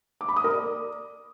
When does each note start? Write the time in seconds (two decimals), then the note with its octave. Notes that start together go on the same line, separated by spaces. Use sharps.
0.21 D6
0.29 B5
0.36 D#6
0.44 A#4
0.52 D5